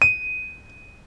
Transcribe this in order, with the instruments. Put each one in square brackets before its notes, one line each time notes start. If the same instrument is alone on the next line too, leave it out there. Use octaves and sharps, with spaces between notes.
[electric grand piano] D#7